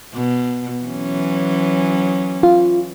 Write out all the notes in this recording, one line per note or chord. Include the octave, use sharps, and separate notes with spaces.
B2
E3 F#3 C#4
F4